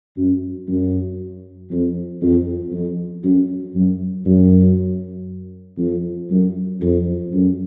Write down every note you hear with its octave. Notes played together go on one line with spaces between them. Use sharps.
F#2
F#2
F2
F2
F2
F#2
F#2
F#2
F2
F#2
F2
F#2